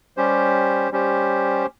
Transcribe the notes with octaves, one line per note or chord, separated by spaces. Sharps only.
G3 C#4 G4 C5
G3 C#4 G4 C5